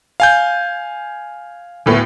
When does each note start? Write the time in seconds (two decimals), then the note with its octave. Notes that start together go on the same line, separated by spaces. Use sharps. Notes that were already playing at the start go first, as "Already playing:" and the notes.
0.20 F5 G#5 G6
1.86 D2 A2 B3